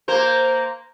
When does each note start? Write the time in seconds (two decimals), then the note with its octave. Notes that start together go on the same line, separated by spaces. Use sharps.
0.08 A#3 A#4 C5